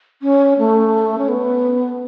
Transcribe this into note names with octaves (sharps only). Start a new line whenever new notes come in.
C#4
A3
C#4
B3